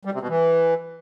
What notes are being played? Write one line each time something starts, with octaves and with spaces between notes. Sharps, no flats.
G3
C3
B2
E3